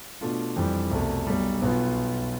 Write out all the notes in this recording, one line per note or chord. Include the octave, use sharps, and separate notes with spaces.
B2 A3 D4 F4
F2 E3 G3
C2 B2 A3
B1 B2 G3
B1 B2 B3 F4